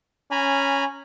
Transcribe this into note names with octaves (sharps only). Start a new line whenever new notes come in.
C#4 G#5 A#5 B5